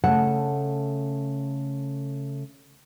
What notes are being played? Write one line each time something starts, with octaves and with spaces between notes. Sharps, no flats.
C#3 A3 F#5 A5